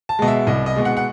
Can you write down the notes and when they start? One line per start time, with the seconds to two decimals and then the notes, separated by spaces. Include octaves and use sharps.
0.09 A5
0.19 B2 G#3 D#5
0.28 E5
0.47 C2 D#5
0.66 D#5
0.76 B2 G#3
0.85 F#5
0.97 F#5